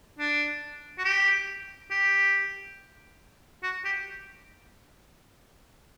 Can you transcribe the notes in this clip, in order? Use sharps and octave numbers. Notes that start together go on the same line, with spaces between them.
D4
F#4
G4
G4
F#4
G4